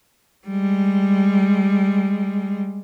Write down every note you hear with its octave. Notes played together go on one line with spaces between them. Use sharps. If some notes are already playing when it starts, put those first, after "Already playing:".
G3 G#3